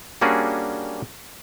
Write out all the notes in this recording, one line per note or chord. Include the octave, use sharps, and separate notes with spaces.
G3 A#3 C#4 D4 F#4 G#4